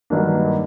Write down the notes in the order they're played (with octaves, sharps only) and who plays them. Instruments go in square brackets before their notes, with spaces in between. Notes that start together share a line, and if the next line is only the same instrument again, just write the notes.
[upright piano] G2 D#3 F#3 A#3 D4